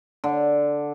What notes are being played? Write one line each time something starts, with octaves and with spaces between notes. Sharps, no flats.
D3